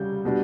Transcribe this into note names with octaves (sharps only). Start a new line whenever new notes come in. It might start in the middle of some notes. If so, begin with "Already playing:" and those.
Already playing: C#3 G3 G6
B2 G3 D4